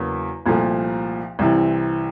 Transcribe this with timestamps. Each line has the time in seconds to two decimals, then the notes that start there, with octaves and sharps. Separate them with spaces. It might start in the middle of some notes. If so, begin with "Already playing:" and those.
Already playing: E2 C#3 F#3 A#3
0.46 C2 A#2 F3 A3
1.39 C2 C3 E3